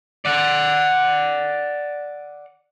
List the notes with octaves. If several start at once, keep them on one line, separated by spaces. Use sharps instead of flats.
D5 F#5